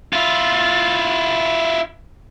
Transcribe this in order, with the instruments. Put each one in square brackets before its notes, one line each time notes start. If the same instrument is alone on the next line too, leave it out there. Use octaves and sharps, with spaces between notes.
[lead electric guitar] E4 F4